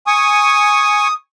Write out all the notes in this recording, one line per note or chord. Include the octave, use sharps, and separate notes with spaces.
G#5 C#6 D#6